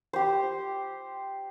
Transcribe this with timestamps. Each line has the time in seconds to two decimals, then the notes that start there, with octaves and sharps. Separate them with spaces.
0.13 G4 C5